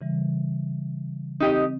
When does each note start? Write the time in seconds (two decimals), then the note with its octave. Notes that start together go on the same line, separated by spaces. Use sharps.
0.01 C#3 E3 G3
1.40 C4 D#4 G4 D#5